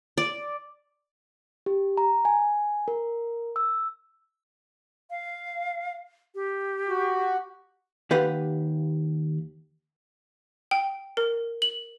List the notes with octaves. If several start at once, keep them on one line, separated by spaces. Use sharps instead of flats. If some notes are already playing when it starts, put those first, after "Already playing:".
D5
G4
A#5
G#5
A#4
E6
F5
G4
F#4
D#2 G4 B4 F5 F#5
G5
A#4
F#7